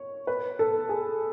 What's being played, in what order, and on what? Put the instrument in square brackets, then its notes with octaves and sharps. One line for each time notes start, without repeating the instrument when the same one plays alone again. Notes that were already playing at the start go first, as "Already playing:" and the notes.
Already playing: [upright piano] C#5
B4
A4
G#4